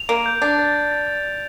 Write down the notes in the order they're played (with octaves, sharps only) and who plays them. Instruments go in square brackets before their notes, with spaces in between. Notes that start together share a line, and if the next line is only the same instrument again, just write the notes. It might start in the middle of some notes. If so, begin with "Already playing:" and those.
Already playing: [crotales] F7
[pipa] A#3 [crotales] D7
[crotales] G6
[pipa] D4 [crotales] A6
[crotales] A6
A6
A6
A6
A6